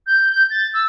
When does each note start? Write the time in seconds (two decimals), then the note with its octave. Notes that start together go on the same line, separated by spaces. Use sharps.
0.07 G6
0.31 G6
0.50 A6
0.74 E6